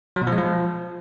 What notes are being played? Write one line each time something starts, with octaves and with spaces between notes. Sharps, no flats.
F#3
B2
F3
G#3
F3